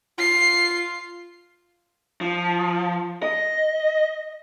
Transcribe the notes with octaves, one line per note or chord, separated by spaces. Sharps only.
F4 C7
F3
D#5